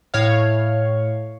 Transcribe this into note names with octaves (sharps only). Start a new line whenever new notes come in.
A2 C#5 F5